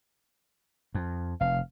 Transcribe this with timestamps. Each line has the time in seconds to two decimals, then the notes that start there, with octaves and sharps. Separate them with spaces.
0.95 F2
1.41 F1 F5